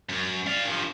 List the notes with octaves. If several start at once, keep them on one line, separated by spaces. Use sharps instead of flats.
F#2
D5 F5
G2 F3